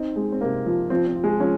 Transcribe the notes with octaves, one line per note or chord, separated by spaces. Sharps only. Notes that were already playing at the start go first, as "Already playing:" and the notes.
Already playing: C4 D#4
G#3
C4
C3 A#3
F3
F3 C4
C4
F4
G#3
F3 C#4